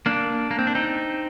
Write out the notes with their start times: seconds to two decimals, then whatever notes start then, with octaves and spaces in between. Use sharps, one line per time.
0.06 A#3 D4
0.51 A#3
0.59 C4
0.67 D4
0.75 C4 D#4